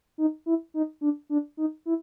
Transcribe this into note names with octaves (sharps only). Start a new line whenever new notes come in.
D#4
E4
D#4
D4
D4
D#4
E4